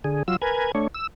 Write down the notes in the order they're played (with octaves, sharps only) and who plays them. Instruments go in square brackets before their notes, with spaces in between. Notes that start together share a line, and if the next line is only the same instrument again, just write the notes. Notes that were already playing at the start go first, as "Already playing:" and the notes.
[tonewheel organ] D3 G#4
F#3 F4 E6
A#4 B4 G#5
A3 D4 C#5
E6